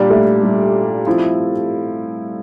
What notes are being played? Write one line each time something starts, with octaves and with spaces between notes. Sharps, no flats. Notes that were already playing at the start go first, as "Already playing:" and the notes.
Already playing: A#2 G3 D4 G4
A3
G3
F3 C4 E4